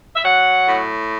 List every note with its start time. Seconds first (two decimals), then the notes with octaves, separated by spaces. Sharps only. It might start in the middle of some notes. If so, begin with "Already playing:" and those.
0.15 E5
0.24 F#3 F#5
0.68 A2